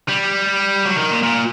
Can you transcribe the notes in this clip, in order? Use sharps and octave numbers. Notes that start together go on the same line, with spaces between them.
G3
F#3
D#3
A#2
A#2